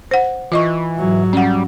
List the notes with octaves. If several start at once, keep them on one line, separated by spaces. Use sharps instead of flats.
C5 F#5
E3 F4 D#5 C#6
G#2 F#3
G3 C#4 F#5